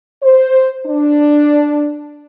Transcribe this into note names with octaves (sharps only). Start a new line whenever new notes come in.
C5
D4